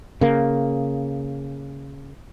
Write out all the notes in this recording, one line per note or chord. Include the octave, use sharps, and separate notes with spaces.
C#3 A#3